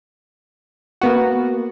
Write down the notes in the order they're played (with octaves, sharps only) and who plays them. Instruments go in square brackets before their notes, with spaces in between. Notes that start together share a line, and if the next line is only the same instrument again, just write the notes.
[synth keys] A#3 B3 F#4